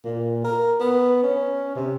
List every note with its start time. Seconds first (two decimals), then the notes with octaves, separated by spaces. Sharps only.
0.05 A#2
0.44 A#4
0.80 B3
1.23 C#4
1.75 C3